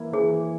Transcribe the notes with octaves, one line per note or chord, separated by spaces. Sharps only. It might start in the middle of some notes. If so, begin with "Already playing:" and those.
Already playing: E3 A#3 E4
E3 G#4